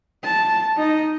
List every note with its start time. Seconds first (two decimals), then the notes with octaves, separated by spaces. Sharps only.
0.24 A5
0.77 D#4